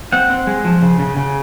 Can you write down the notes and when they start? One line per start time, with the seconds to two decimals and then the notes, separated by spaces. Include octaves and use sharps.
0.13 C4 F#5
0.30 C4
0.47 G#3
0.64 F3
0.82 C#3
0.99 C#3
1.17 C#3